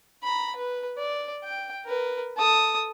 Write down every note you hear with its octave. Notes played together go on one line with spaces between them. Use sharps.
A#5 B5
B4
D5
G5
A#4 B4
A4 D#6